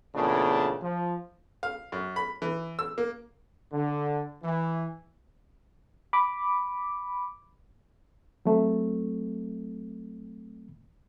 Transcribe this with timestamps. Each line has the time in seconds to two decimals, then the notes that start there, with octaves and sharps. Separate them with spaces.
0.15 E2 A#2 C#3 A3 B3 D4
0.82 F3
1.63 F5
1.92 F#2
2.16 B5
2.42 E3
2.79 E6
2.98 A#3
3.72 D3
4.43 E3
6.13 B5 D6
8.45 F#3 A3 C4